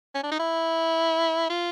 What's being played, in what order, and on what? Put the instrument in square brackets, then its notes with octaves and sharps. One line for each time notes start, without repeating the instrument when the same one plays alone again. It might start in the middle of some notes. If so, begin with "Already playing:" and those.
[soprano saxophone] C#4
D4
D#4
E4
F4